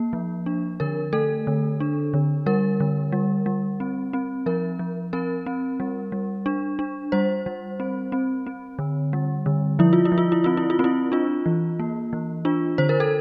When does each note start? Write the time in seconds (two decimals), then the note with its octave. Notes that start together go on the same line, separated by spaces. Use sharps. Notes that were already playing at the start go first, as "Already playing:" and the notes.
Already playing: A#3
0.13 F3
0.46 D4
0.80 D3 A#4
1.13 A3 A4
1.47 D3
1.80 D4
2.14 D3
2.46 G3 A#4
2.80 D3
3.12 G3
3.46 G3
3.80 C4
4.13 C4
4.46 F3 A#4
4.79 F3
5.13 C4 A#4
5.46 C4
5.80 G3
6.12 G3
6.46 D4
6.79 D4
7.12 G3 C5
7.46 G3
7.80 C4
8.12 C4
8.47 C4
8.79 D3
9.13 G3
9.46 D3
9.79 F3 E4
9.93 F4
10.05 E4
10.12 F3
10.18 F4
10.32 E4
10.44 C4 F4
10.57 E4
10.70 F4
10.79 C4
10.84 E4
11.12 D4 F4
11.46 E3
11.80 A#3
12.13 E3
12.45 D4 F4
12.78 D3 C5
12.89 A#4
13.00 A4